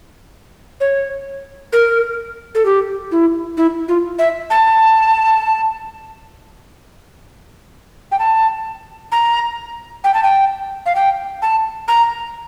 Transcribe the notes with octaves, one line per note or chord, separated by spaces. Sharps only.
C#5
A#4
A4
G4
E4
E4
F4
E5
A5
G5
A5
A#5
G5
A5
G5
F5
G5
A5
A#5